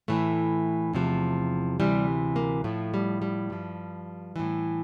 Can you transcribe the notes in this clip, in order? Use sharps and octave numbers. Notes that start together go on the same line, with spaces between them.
A2 E3 A3
E2 C3 F3
D2 C3 E3 G3
A#3
A2 F3 A3
G3
G3
G2 F3
A2 E3